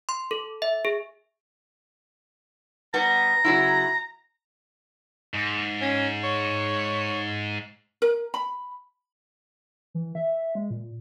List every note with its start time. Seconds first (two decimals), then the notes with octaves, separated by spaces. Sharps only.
0.09 C6
0.31 A4
0.62 E5
0.85 G#4
2.94 G3 B3 A#5
3.44 C#3 F#3 E4
5.34 G#2
5.81 C#4
6.24 C#5
8.02 A#4
8.34 B5
9.94 E3
10.15 E5
10.55 G#3
10.70 A#2